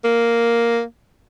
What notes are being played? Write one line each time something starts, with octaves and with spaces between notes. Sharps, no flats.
A#3